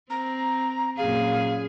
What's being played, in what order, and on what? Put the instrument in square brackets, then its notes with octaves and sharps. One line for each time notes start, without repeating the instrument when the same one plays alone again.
[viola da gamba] C4 [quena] A#5
[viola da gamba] F#2 A#2 G#4 [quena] F5